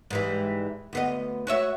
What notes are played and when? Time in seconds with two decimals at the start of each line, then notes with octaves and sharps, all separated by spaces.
0.10 G#2 E3 G3
0.93 D2 B3 D#5
1.47 F#4 C#5 E5